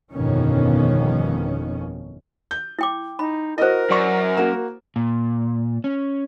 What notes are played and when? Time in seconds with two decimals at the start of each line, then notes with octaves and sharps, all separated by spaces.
0.12 G1 F2 B2 D#3 C#4
2.51 G6
2.79 E4 G5 D6
3.19 D#4 B5
3.58 E4 F#4 A#4 C5 D#5
3.91 F#2 D5 C#6
4.37 A#3 F#4 A#5
4.96 A#2
5.84 C#4